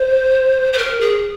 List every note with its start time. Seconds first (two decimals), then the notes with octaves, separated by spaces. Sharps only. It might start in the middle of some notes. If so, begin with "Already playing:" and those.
Already playing: C5
0.73 C5
0.77 A#4
1.00 G#4